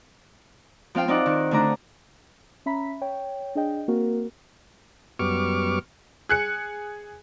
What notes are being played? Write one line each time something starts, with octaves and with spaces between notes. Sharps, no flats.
F3 C4 F5 G5
C4 D#4 D5 F#5
D#3
D3 A3 D4 A#5
C#4 E5 A#5 B5 B6
C#5 G5
D4 G#4 D#5 G5
A#3 C4 F#4 A#4
F#2 G3 B3 C#6 D6 F6
G#4 F#6 C#7